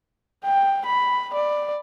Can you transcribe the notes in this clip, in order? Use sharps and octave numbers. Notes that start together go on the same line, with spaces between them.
G5
B5
D5